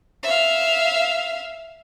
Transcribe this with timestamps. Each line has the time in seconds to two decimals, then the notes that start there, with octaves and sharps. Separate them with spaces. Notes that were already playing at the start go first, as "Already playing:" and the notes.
0.23 E5 F5